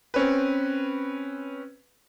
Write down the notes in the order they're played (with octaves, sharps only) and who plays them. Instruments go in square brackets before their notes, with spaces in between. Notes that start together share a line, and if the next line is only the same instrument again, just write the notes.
[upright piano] C4 C#4 B4